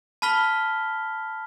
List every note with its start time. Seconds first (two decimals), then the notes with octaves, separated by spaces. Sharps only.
0.22 A5 B5 F6 B6 G7